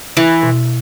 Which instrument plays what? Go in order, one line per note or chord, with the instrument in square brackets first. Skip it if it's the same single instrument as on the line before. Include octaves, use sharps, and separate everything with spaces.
[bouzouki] E3 [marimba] E4
[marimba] B2